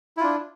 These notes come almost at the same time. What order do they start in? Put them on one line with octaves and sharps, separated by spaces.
E4 F4 D4